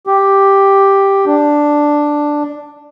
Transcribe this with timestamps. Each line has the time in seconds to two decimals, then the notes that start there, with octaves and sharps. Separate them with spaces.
0.07 G4
1.26 D4